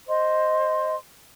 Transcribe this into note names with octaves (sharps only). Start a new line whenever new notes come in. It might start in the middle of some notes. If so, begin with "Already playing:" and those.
C5 D#5 C6